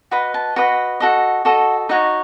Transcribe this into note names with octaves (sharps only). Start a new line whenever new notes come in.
F#4 B4 D#5 B5
A5
F#4 B4 D#5 F#5
F#4 A4 D#5
F#4 A4 D#5
D#4 F#4 C#5 D#5